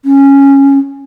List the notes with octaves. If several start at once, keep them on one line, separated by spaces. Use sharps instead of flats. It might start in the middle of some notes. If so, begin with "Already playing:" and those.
C#4